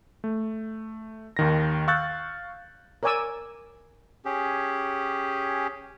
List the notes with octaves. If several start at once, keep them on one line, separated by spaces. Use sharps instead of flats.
A3
D#2 D#3 A#6
F5 C#6 E6 F#6 G6 A6
A#4 C#5 D5 G#5 D6 E6
C#4 G4 G#4